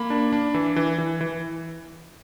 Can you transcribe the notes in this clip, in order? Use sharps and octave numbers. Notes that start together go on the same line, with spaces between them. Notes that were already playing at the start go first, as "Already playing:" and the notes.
Already playing: A#3 B5
D4
D4
E3
E3
E3
E3